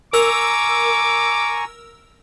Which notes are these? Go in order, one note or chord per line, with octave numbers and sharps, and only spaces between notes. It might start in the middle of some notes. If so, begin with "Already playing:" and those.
A#4 G#5 A#5 C#6 D6 E6